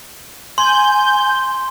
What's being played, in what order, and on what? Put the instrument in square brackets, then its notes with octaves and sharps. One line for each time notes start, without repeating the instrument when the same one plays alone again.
[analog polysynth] G#5 G6 [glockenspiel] C6